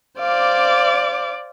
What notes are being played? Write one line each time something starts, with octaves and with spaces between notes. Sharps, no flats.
C5 D5 F5 D6